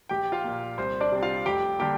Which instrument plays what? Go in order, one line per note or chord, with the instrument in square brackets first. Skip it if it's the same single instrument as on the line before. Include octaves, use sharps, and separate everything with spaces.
[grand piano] A#1 G4 G5
F4 F5
A#2 A#3
C2 C5
D4 D5
C3 G3 C4
F4 F5
F1 G4 G5
D3 G3 A#3 G4 G5